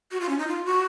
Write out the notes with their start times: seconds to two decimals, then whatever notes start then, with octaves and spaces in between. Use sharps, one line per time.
0.11 F#4
0.20 F4
0.29 C#4
0.39 D#4
0.48 F4
0.65 F#4